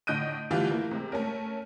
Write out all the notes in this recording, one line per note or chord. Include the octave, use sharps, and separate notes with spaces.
A2 D3 D#5 G6 D7 D#7
D3 E3 G3 A3 F4 G4
E3 A#3 E4
C3 G#3
A3 C#4 A#4